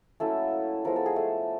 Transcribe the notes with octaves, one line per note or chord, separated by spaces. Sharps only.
F#3 A3 A#3 C#4 E4 A4
F3 G#3 B3 A#4
A4
G#4
A3 A4